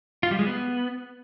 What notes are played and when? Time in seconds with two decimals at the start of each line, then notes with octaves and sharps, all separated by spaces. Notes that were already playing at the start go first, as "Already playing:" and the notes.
0.23 F4
0.31 G3
0.39 G#3
0.47 B3